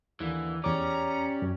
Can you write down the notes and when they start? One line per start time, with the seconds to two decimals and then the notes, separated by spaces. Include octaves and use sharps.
0.20 D#2 D3 E3 A#3
0.64 E2 C#4 G4 C#5 D5 A#5 D6
1.42 F#2